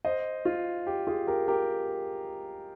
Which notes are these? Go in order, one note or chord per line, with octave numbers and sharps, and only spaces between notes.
C5 D#5
F4
G4
F4 G#4
G4 A#4
G4 A#4